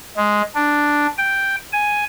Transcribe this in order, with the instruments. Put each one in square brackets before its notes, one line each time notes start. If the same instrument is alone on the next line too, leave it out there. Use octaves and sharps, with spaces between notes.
[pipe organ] G#3
D4
G5
G#5